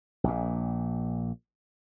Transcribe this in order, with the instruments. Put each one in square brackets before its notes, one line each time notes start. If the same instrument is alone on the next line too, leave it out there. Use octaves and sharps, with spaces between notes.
[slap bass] A#1 A#2